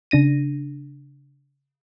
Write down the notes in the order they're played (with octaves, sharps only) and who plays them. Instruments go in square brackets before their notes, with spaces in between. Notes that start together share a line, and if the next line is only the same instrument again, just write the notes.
[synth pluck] C#3 D4 A#6 D#7